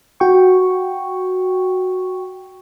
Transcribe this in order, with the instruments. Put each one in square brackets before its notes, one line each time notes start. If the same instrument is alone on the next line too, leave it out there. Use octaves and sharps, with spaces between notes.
[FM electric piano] F#4 G5 C#6